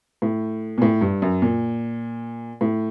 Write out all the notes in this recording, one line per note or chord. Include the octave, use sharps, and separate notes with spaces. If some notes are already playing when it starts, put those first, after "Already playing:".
A2
A#2
A2
G2
F#2
A#2
A2